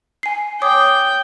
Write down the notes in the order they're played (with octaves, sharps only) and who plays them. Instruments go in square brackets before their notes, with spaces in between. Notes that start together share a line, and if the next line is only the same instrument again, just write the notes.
[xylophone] G#5 C7
[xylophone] C#5 D6 D#6 [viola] G5